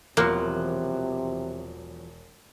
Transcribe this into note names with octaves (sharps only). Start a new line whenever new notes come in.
E1 E2 C3 F3 F#3 A#3 D6 F#6